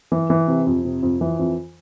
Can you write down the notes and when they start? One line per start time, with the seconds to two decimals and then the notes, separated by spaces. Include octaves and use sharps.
0.12 E3
0.30 E3
0.48 C3
0.67 F2
0.85 C3
1.03 F2
1.21 E3
1.39 F2